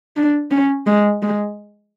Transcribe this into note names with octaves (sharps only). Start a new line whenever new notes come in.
D4
C#4
G#3
G#3